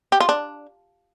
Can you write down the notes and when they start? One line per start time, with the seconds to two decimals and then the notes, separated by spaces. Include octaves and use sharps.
0.12 G4
0.20 F4
0.29 D4